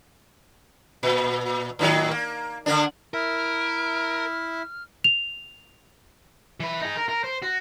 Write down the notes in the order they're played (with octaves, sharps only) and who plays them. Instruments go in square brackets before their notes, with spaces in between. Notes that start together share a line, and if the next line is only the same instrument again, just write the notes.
[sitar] A#2
A2 D#3 F#3
A#3
D3 A#3 D4
[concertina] E4 E5 [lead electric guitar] A#4 [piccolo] F6
[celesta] F7
[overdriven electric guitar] E3 B4
D#4 G#4
A#4
A#4
C5
F#4